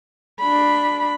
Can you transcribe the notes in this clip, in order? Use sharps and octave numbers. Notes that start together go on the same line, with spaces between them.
D4 B5